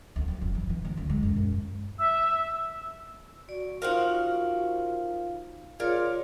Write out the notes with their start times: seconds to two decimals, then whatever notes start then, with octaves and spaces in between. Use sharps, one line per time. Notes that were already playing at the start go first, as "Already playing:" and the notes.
0.16 D2
0.28 F2
0.41 F#1
0.55 E3
0.70 E3
0.85 D2
0.97 D2
1.09 G#3
1.23 F#2
1.36 F#2
1.99 E5 E6
3.49 F#4 D5
3.82 D#4 F4 A#4 C5 F5 F#5
5.80 F4 G#4 A#4 C#5 D5 F5